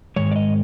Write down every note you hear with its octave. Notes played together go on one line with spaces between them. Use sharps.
G#2 D#3 G#3 C#5
D5
D#5